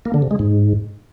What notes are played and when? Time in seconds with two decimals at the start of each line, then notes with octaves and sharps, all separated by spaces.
0.05 A#3
0.14 D3
0.22 C3
0.31 G#3
0.39 G#2